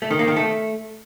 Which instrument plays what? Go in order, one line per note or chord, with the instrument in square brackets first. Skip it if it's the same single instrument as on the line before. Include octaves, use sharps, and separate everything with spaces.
[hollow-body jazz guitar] A3
D#3
A#3
D#3
A3